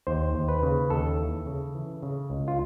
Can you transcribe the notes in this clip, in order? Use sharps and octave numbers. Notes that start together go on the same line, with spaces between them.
D#2 C5
D#2
B4
C#3
D#2 A4
E3
C#3
E3
C#3
C#2
F4